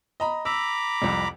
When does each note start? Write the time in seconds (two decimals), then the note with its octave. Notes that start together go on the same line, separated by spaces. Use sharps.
0.20 D#5 A#5 B5
0.45 A#5 B5 D6 E6
1.02 C2 F2